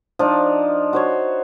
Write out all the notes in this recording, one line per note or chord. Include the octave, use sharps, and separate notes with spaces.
F3 D4 D#4
F#4 C5 C#5